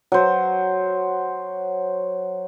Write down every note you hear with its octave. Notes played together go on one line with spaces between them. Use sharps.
F#3 C5